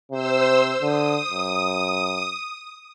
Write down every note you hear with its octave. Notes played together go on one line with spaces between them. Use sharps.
C3 C5 E6
D3 D#6
F#2